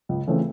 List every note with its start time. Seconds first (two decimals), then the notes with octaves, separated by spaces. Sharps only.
0.09 C#2
0.27 C#3 E3 A3 C4